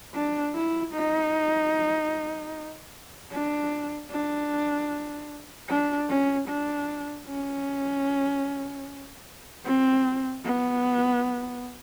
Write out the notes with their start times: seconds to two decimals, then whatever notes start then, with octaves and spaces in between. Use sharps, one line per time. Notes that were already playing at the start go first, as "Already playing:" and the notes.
0.14 D4
0.55 E4
0.94 D#4
3.32 D4
4.11 D4
5.69 D4
6.10 C#4
6.48 D4
7.27 C#4
9.65 C4
10.44 B3